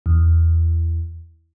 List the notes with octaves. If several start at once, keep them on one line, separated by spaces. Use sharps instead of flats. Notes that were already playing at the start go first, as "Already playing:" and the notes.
E2